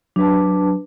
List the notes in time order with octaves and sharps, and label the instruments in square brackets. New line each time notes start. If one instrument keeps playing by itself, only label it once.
[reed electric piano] F#3 [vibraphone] D4 B4 A5